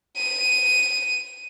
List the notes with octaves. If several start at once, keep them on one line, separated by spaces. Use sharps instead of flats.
D#7